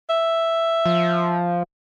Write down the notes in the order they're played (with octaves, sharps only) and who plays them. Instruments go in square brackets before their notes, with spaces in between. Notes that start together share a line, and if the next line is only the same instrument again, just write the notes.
[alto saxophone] E5
[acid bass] F3